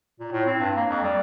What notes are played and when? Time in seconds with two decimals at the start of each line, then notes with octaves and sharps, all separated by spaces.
0.20 A#2
0.32 A2
0.46 C4
0.60 G2
0.76 A#3
0.90 F2
1.03 G3